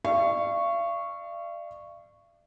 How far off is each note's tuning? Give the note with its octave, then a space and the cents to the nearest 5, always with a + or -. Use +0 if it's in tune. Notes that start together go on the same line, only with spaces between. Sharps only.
D5 +30 F5 -40 C#6 -5